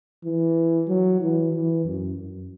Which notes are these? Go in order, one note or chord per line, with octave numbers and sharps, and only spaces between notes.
E3
F#3
E3
E3
F#2
F#2